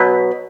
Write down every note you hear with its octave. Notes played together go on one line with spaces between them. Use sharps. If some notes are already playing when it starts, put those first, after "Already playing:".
Already playing: B2 F#3 B3